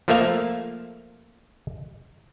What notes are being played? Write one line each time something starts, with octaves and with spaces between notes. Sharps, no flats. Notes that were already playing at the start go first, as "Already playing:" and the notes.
F3 A3 A#3 E5 F5